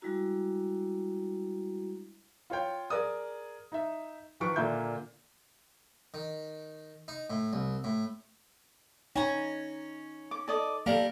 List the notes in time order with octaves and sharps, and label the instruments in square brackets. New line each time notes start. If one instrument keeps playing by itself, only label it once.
[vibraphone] G3 G#3 D4 E4 F#4 A#5
[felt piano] F4 C#5 G5
G#4 A#4 D5 D#6
D#4 E5
D#3 F3 B4 C#6 D7
A#2 D3 A#3 E5 G6
[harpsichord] D#3
D#4
A2
C2
A2
[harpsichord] C#4 [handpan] D#4 [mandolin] G#5 A#5
[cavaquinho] D6
A4 D5 D#5
[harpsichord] G3 A#4 [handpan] A#3 [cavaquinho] A4 F5